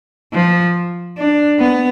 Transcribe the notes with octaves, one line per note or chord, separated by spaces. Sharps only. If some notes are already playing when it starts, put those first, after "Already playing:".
F3
D4
B3